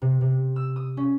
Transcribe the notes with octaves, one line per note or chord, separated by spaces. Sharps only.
C3
C3
E6
D#6
C#4